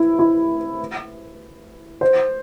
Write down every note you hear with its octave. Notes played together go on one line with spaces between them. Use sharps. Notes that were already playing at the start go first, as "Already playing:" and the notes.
Already playing: E4
E4
C5